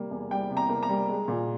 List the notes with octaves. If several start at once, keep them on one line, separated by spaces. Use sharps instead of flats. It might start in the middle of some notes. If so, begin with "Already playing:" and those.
Already playing: C3 G3 A#3
E2
G3 G5
C3
A#5
A#3
A#5
G3
G#3
A#2